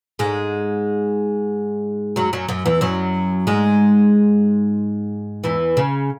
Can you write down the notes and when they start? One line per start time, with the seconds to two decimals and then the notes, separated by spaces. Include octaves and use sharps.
0.19 G#2 G#3
2.16 F#2 F#3
2.33 F#2 F#3
2.49 F#2 F#3
2.66 E2 E3
2.81 F#2 F#3
3.47 G#2 G#3
5.44 E2 E3
5.77 C#3